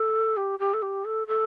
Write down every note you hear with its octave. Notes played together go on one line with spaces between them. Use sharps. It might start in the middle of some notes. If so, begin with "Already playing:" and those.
Already playing: A4
G4
G4
A4
G4
A4
A4